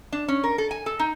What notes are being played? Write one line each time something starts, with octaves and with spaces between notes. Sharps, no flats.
D4
C#4
A#4
A4
G#5
A4
D#4